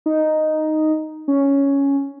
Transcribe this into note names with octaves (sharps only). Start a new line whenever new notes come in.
D#4
C#4